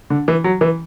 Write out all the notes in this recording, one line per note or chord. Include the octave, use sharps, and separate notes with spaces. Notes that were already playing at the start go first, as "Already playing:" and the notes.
D3
E3
F#3
E3